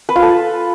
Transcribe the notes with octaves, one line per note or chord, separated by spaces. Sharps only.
B4
F4
A4